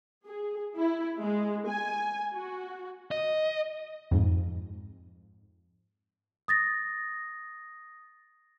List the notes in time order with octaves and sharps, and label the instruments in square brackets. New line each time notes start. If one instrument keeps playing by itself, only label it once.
[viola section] G#4
E4
G#3
G#5
F#4
[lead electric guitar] D#5
[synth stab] F2 G#2
[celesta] D#6 A6 A#6